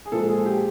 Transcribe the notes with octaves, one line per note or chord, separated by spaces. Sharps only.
G#4
A#2 F3 G#3 A4
G#4
G4